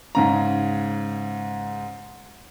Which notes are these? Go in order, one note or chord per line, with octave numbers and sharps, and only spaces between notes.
G#2 C#3 A#5